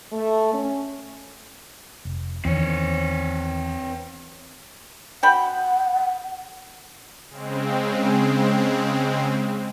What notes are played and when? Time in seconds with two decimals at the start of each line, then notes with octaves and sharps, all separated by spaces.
0.13 A3
0.54 C#4
2.05 F1
2.45 E2 D#3 C4 C#5
5.23 F#4 F#5 G5 B5
7.29 C#3 G#3 C4